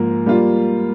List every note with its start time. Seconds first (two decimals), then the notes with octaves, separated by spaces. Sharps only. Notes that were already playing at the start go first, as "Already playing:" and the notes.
Already playing: G#2 F3 A#3
0.26 G3 A#3 F4